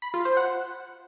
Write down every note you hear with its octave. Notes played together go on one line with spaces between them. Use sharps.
B5
F4
C5
F#5